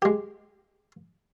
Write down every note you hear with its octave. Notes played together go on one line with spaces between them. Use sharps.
G#3 G4